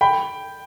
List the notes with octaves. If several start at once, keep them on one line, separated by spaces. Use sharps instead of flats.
G5 B5